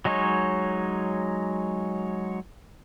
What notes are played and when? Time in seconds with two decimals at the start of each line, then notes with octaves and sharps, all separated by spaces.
0.05 F#3 G#3 D#4 C#5